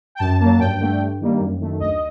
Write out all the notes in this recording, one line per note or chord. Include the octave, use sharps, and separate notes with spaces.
G5
F#2 A5
F#3 A#3
G2 G5
D3 A3
G2
D#3 G3 A#3
F#2
D#3 A3
D2 D#5